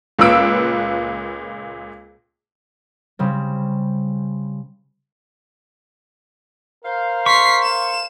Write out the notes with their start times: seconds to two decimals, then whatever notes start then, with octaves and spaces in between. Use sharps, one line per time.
0.19 C#2 A#2 B4 E6 D7
3.19 C#3 G3 C4
6.85 A#4 C5 F5
7.26 C6 C#6 B6 C7
7.63 E7